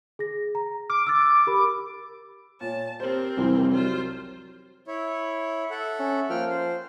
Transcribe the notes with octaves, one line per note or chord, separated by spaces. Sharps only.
G#4 A#6
A#5
D6 F6
E6 F6 A6
G4 A#4 B5
A#2 C#5 A5
C4 G4 A#4 C5
C2 F2 E3
F#3 F4 C5
E4 C#5
A4 E5 F#5
C#4
F3 A#3 G5 F6
C5